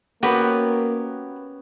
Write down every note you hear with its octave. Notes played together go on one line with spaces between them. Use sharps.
A#3 B3 C#4 F#4 G4 B4